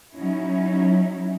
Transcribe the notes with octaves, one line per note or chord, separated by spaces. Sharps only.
F#3 C#4 D#4 E4